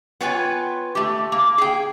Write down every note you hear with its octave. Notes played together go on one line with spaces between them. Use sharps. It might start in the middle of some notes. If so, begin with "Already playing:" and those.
B3 F4 B4 C#5 G5 G#5
A3 G4
A#3
G#4 G5